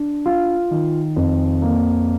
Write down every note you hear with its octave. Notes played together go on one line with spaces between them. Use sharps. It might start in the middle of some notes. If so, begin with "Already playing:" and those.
Already playing: D4
F4
D#3
F2
A#3